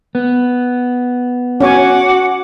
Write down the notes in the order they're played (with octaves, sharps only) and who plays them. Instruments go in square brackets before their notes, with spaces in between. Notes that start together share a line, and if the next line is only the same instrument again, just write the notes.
[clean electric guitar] B3
[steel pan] C#4 C#5 G#5 [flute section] F#4 F#5 D6